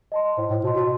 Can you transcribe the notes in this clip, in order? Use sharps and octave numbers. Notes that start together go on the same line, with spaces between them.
D#5 A5 C6
A2 C5
A2
B2 D#5 A5 C6
B2